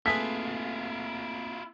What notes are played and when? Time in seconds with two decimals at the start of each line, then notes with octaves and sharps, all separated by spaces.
0.06 A3 A#3 C4 E4 F4 G#4 B4 B6